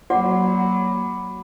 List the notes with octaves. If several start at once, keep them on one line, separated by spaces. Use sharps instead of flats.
F#3 A#3 F#4 D5 F#5 B5 D6